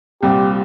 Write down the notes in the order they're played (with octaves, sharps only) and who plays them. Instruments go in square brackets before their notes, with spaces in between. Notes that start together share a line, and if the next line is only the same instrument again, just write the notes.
[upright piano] C2 A#2 G3 C4 [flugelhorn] G4